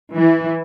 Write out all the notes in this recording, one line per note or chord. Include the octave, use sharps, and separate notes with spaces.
E3